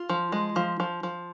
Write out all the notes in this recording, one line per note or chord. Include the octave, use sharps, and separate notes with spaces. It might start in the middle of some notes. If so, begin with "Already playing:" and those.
Already playing: F4
F3
G#3
F3
F3
F3